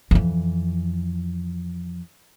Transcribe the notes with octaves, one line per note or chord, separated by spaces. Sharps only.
F2 E3